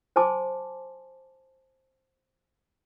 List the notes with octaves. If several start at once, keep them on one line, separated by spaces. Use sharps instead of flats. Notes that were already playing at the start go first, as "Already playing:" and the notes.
C5 G#5 A5 C6 D6